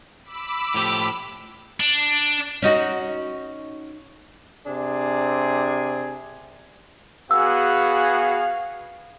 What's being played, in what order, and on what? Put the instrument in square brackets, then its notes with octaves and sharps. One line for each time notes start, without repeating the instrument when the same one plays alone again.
[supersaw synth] B5 D6 E6
[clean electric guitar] A2 F3 G4
[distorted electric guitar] D4
[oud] C#4 D#4 F#4
[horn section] C3 D4 G#4
[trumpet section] B3 F#4 G#4 [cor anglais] F5 [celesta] E6